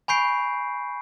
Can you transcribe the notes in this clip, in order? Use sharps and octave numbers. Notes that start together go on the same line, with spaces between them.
G#5 B5 C#6 G6 C7 D7